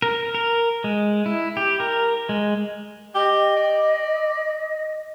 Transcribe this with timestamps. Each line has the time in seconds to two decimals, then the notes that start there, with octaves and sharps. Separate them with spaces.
0.02 A#4
0.35 A#4
0.84 G#3
1.26 E4
1.57 G4
1.80 A#4
2.29 G#3
3.15 G4 D#5
3.57 D5